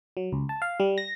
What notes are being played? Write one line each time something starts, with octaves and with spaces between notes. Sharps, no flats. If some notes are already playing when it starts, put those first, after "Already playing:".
F#3
C#2
A5
F5
G3
A#6